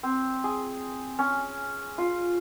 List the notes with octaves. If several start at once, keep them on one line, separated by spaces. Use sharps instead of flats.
C4
G#4
C#4
F4